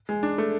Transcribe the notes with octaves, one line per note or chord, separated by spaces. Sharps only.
G#3
D4
A3